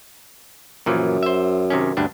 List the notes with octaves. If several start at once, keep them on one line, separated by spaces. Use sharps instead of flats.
F#2 A#2 E3 F3
C5 E5
C3 D#3 C#4
D2 G2 D4